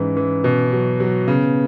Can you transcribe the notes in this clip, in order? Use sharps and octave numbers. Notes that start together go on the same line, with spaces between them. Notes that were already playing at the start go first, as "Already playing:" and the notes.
Already playing: G#2 E3 C#4
E3
B2
F#3
F#3
C#3 B3